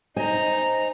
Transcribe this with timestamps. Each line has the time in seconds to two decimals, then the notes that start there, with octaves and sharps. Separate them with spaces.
0.16 D#4 C5 D#5 G#5 A#5